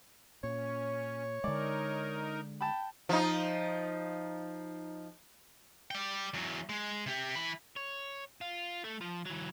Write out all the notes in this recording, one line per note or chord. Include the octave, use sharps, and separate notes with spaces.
A#2 C#4 C#5
D3 G#3 D#4 A#4 D5
G5 A5 B5
F3 D#4
D5 G5
E2 F#3
G#3
C3 G4
E3 B5
C#5
F4
A3
F3
E3 F#3